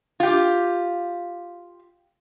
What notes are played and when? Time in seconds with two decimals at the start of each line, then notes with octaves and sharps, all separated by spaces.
0.20 F4 G4